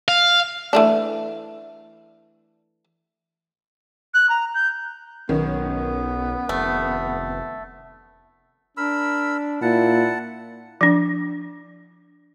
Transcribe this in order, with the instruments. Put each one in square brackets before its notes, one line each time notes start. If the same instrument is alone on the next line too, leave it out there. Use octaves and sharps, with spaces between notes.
[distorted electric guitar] F5
[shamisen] E3 A3 D4
[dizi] F#6
A#5
G6
[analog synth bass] B1 [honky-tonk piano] D#3 C#4 [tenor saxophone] B3
[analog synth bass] F1 [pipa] A3
[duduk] D4 [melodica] A#4 B5 E6
[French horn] A#2 [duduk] E4 [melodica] F#5 A5
[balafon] F3 D4